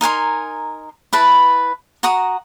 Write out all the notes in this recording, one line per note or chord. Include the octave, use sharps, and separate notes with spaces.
D#4 A#4 G#5 C6
E4 B4 A5
F#4 F#5 A#5 D#6